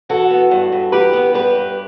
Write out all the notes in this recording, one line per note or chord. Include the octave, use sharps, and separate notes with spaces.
E3 F#4 A4
B3
G2
G2
E3 G4 B4
B3
G2 G4 B4
G2